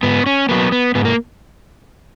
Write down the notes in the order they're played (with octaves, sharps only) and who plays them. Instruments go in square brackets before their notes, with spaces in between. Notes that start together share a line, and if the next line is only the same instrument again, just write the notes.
[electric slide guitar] G#2 B3
C#4
F#3 A#3 B3
B3
G#2 B3
A#3